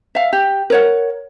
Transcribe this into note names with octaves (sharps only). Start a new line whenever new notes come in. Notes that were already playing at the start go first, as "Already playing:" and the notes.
E5 F5
G4
A#4 C#5 F#5